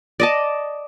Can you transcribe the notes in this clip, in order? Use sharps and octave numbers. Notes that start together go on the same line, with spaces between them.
D5 D#5 A5